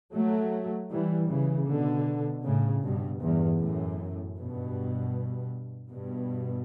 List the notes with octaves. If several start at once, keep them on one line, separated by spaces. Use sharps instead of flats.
F#3 A3
E3 G3
C#3 E3
B2 D3
A2 C#3
G2 B2
E2 G2
F#2 A2
G2 B2
G2 B2